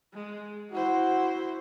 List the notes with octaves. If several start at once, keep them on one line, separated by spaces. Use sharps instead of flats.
G#3
E4 F#4 C5